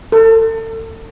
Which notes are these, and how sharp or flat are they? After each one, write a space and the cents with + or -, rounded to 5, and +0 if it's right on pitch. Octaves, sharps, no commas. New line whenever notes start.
A4 +35